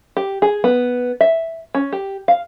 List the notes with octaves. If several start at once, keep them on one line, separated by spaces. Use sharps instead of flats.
G4
G#4
B3
E5
C#4
G4
F5